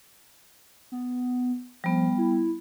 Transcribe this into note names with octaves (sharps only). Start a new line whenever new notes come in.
B3
F3 G3 B3
E4